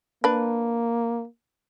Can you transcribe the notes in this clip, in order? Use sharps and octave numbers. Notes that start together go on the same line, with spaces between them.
A#3 D4 B4